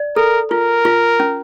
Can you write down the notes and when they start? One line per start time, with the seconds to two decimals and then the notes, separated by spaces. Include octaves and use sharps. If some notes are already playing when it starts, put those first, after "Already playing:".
Already playing: D5
0.16 A4 A#4
0.51 F4 A#4
0.85 F4
1.20 C#4